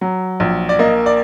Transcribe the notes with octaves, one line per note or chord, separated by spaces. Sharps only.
F#3
A#1
D5
A#3 D#5
D5